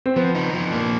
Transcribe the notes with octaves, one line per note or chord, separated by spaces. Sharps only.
C4
F3 B3
D#4
F3
A#3